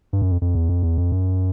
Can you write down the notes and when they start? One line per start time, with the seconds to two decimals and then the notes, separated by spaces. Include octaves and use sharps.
0.13 G2
0.22 F#2
0.31 F2
0.42 F2
0.55 E2
0.69 F2
0.83 E2
0.98 F2
1.12 F#2